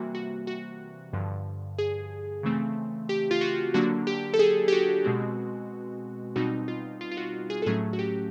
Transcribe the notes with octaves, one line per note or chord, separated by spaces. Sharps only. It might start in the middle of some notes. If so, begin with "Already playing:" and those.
Already playing: C3 E3 G3 A#3 F#4
F#4
F#4
G2 D3 F3
G#4
C#3 E3 A3 C4
G4
F4
F#4
D3 F#3 A#3 D4 F#4
G4
A4
G#4
G4
F#4
B2 G#3 C4
B2 G3 C4 D#4 F#4
F4
F4
F4
F#4
G#4
A4
A2 F#3 A3 C#4 G#4
F#4
G4